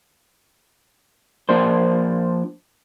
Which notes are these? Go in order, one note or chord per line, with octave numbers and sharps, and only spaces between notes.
F3 A#3 D4 C5